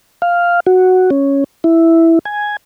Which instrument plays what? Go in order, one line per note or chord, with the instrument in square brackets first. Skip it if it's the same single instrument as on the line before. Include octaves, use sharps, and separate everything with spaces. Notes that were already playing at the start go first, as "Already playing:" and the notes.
[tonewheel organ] F5
F#4
C#4
E4
G#5